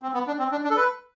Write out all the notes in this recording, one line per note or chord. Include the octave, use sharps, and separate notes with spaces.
C4
B3
D4
C4
D4
D4
A4
B4